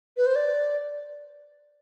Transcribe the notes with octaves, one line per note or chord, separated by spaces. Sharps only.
B4
C5
D5